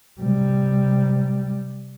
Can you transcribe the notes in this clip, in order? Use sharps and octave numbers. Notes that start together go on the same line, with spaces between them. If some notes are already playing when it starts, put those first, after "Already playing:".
C3 G3